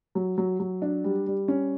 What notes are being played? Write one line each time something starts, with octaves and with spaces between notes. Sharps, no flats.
F#3
F#3
F#3
D4
G3
G3
C#4